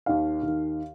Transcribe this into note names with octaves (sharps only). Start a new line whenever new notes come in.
D#2 D#3 F5
D#2 D#3